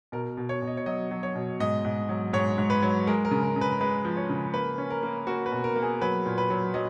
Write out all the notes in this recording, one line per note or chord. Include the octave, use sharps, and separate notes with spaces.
B2 A#4
B2
C#5
B2
D#5
C#5
F#3 D#5
F#3
C#5
B2
G#2 D#5
G#2
F#3
G#2 C#5
G#2
B4
F#3
G#3 A#4
A#4
C#3
A#4
C#3
B4
G#3 B4
F3
C#5
C#3
A#3 B4
C#4
A#4
A#3
A#3 F#4
B4
B2
A#4
A#3
G#4
F#3 B4
A#2
B4
F#3
F#3 D#5